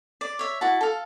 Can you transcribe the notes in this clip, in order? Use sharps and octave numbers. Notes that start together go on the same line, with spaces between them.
D5
C#5 E5
E4 F#4 A5
A4 F5